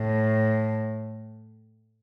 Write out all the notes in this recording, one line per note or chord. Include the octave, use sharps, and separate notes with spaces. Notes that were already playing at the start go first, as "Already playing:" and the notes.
Already playing: A2